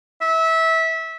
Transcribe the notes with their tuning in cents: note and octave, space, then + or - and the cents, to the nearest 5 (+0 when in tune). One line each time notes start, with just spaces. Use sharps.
E5 -20